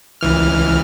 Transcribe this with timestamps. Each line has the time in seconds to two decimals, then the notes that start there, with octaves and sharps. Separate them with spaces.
0.21 C#2 E3 F6